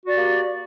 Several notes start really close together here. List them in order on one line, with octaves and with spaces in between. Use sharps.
F#4 D5 G4 A#3